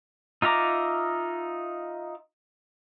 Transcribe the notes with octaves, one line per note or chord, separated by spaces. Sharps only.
D#4 F4 E5 A#5 D6